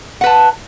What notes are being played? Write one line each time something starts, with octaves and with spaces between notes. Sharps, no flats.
B4 F#5 A5